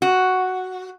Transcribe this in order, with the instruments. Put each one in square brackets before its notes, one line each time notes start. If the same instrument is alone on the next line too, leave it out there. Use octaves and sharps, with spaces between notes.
[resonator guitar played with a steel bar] F#4